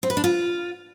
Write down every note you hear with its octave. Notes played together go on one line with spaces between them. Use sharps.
C4
B4
D4
F4